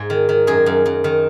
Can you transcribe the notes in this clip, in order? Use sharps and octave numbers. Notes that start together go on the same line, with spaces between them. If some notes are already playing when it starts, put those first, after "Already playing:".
Already playing: G#2 G#4
D#3
D#3
F#2 G#4
F#2
F#2
D#3